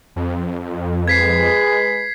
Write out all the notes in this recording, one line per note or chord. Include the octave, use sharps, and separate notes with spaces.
F2
G#3 G#4 B4 G#6 B6 C7